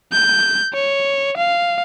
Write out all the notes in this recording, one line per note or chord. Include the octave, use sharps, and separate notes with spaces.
G6
C#5
F5